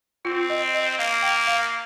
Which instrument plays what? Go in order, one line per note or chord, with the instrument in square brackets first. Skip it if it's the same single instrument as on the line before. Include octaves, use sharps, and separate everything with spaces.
[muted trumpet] C4 [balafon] F4
[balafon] D#5
D#5
[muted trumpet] A#3 [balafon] F5
[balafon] G5
F5